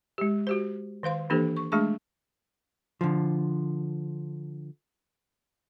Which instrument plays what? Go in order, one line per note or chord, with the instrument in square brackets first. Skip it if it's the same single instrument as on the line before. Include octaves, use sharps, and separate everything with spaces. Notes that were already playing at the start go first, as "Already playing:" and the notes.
[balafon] G#3 G4
F#4 G4 C5
D#3 C5 F5 C6
E3 A#3 D4 G4 A4 C5
C#6
G#3 A3 D4 G#4 A5 C#6
[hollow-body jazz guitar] D3 F3